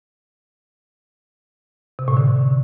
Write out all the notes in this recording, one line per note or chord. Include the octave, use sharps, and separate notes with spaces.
C3
A2
D3